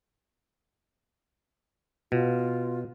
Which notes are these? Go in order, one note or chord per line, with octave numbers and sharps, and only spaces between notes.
B2 F4